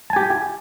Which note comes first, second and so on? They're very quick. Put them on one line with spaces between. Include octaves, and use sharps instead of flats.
A5 G#5 G4